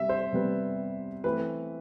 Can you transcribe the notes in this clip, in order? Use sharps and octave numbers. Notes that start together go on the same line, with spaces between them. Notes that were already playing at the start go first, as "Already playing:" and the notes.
Already playing: C3 G3 E5
C5
C3 G3 B3
E3 A3 C4 B4